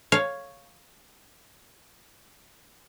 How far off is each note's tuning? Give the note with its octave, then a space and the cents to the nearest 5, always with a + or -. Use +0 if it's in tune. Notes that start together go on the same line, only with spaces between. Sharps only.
C#5 +0 F5 +0